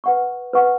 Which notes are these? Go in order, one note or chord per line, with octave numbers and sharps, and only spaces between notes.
B4 F#5 C#6
B4 F#5 C#6